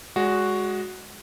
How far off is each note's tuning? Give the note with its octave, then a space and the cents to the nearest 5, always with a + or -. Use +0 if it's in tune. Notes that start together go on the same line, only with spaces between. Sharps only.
G#3 -5 F#4 +0 D5 -45